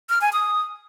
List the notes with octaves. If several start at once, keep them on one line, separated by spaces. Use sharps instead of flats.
F6
G#5
D#6